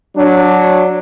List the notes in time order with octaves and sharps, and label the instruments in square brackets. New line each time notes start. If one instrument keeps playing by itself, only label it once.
[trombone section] F#3 D4